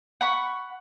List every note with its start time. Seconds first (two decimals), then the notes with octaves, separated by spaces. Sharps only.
0.21 F#5 B5 C#6